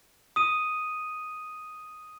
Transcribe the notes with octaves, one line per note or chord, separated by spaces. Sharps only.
D#6 D#7